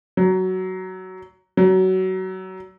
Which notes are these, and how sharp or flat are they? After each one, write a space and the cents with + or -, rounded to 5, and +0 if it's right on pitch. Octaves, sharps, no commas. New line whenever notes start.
F#3 +10
F#3 +20